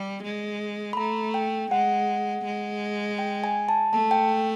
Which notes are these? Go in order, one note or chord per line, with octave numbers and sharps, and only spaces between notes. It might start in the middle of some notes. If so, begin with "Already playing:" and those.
Already playing: G3
G#3
B5
A3 A#5
G5
G#3 F#5
G#3
G5
G#5
A5
A3 A5
G5